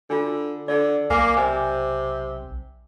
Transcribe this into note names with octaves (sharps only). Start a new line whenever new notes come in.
D3 D4 F4
D3 D5
B1 A#3 G#5 D6
C3 G#5